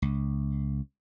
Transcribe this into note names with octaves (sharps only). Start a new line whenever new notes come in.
C#2